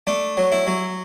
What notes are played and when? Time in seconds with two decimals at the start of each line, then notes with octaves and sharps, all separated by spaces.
0.07 A3 D4
0.37 F#3
0.52 E4
0.67 F#3